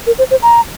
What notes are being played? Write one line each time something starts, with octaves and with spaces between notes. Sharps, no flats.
A#4
C5
C5
A#5